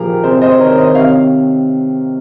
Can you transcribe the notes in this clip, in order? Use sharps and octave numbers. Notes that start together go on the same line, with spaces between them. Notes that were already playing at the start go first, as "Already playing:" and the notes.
Already playing: A#2 D#3 F3 G4 G#4 A#4
C3 G#4 C5
C5 D#5
D#3 A#4 C#5
C5 D#5
C3 C#5 F5